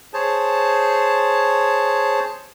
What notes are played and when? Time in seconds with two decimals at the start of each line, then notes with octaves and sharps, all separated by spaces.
0.14 G#4 C5 C#5 A5